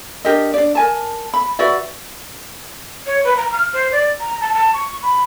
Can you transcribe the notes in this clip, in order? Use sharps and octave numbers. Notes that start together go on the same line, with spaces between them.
D4 G4 A#4 D#5
D4 D5
A#4 G#5 A5
B5
F#4 B4 D5 E5
C#5
B4
A#5
F6
C5
D5
A#5
A5
A5
C#6
B5